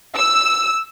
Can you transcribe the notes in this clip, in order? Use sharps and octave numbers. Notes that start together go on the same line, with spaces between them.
E6